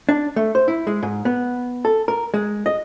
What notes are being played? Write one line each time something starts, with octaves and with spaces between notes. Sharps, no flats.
D4
A3
C5
E4
G#3
G#2
B3
A4
A#4
G#3
D#5